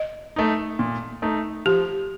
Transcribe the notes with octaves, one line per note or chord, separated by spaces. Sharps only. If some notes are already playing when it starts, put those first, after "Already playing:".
Already playing: D#5
A3 D#4
A#2
A3 D#4
F3 G4